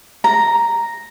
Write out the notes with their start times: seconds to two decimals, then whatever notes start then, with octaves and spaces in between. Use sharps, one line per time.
0.24 A#5